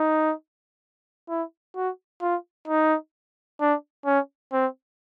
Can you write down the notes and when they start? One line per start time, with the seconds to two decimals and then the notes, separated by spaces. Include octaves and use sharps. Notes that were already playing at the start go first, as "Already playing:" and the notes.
Already playing: D#4
1.29 E4
1.76 F#4
2.22 F4
2.68 D#4
3.60 D4
4.06 C#4
4.53 C4